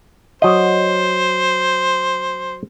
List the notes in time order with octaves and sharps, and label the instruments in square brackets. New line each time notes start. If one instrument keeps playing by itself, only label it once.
[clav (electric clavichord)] F#3 D#5 [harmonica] C5